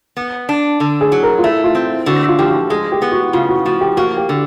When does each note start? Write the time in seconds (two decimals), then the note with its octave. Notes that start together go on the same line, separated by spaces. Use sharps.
0.17 B3
0.49 D4
0.80 D3
1.01 G#4
1.12 F#3
1.23 A#4
1.39 F4
1.44 A3 E4
1.64 F4
1.75 C4
2.06 D3 F#4
2.29 F4
2.39 F3 G4
2.49 F#4
2.70 G#3 G#4
2.92 G4
3.02 B3
3.12 F#4
3.33 C#3 F4
3.49 F#4
3.66 F3 F#4
3.81 G4
3.97 A#3 F#4
4.17 G4
4.29 D3